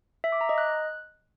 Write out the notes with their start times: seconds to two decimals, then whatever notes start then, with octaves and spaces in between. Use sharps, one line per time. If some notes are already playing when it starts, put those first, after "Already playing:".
0.24 E5
0.32 D6
0.41 A#5
0.49 D#5
0.58 F#6